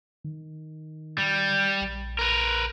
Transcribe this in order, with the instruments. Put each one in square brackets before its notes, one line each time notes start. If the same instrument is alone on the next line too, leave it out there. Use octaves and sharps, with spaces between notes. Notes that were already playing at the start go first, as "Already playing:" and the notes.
[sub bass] D#3
[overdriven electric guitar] G3
[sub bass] A#1
[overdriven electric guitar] A#4 B4